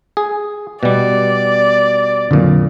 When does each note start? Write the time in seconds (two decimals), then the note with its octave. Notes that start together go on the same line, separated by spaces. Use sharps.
0.17 G#4
0.83 B2 G3 D5
2.31 F2 A#2 D3 F#3